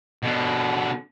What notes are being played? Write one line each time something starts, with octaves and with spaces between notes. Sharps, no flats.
B2 D3